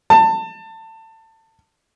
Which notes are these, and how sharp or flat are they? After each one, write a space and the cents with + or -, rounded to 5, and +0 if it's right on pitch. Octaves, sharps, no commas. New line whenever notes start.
A5 +25